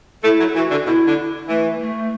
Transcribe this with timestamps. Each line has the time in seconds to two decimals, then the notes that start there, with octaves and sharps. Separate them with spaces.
0.24 A3 E4
0.39 F#3
0.49 A4
0.55 E3 F#4
0.71 D3
0.86 B2 E4
1.07 D3
1.49 E3 A3
1.80 A3